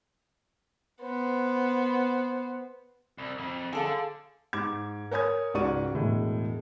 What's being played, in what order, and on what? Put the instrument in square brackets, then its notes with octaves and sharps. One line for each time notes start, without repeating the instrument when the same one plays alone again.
[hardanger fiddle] B3 C5
[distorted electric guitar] C2
F2
[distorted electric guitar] D3 [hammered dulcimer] G#4 A4 F5
[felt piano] G#2 D6 G#6
A#4 C#5 G#5 D#6 G#6
C#2 G#2 F#4 D5 C#6 D#7
E1 A2 G#3